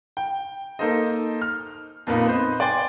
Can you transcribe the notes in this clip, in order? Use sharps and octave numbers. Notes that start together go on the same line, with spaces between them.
G5
A#3 D#4 A4 C5 D#5
F6
F2 A#2 A#3 B3 D#4 F4
B4 C5 D#5
D5 G5 G#5 C6 A6